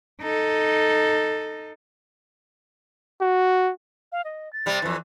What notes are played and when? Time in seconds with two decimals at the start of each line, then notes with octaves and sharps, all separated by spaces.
0.22 D#4 A4
3.21 F#4
4.12 F5
4.25 D#5
4.53 A6
4.66 C3 G3
4.82 F2 E3